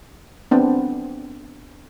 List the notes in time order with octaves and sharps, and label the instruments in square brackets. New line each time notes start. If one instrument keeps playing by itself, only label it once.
[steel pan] B3 C4 D4